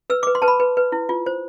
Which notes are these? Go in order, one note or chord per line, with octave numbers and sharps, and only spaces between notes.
B4 E6
D6
B4
C6
B4 A5
B5
B4
B4
E4
F4
C5